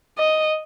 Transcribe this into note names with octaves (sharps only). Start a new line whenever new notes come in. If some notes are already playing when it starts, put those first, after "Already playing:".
D#5